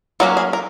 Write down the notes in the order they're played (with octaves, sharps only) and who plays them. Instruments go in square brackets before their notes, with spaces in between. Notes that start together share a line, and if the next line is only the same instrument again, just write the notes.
[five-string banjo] F#3 A#3 C#4 F#4
G#4
A#4